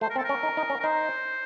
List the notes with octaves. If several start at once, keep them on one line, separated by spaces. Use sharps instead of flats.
A3 C5
A#4
C4 A4
C#4 A#4
D#4
D#4
C#4
A#4
D#4 C5